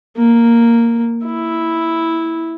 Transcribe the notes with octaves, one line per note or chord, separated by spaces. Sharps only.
A#3
E4